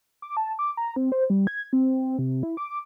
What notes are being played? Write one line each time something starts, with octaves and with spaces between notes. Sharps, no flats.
D6
A5
D6
A#5
C4
C5
G3
G#6
C4
C3
E4
D6